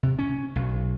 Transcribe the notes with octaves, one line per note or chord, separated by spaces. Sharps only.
C3
C#4
B1